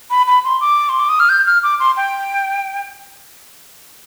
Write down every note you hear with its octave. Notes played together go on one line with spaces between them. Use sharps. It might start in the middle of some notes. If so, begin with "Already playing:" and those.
B5
B5
C6
D6
C6
D6
D#6
F6
G6
F6
D6
C6
G5